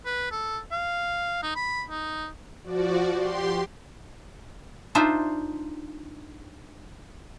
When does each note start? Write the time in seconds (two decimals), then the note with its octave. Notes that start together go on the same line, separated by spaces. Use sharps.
0.05 B4
0.32 A4
0.72 F5
1.43 D#4
1.56 B5
1.90 D#4
2.64 F3 F#4 D5
3.16 G4 C6
4.95 D4 D#4 F4 C5 E5